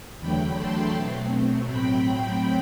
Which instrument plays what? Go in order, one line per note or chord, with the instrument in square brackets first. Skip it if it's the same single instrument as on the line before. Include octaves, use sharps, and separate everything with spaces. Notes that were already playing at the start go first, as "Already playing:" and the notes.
[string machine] E2 D3 F#3 A3 G5 B5
A5 C6
B2 F#3 A3 C4
A2 F#3 C4 G5 B5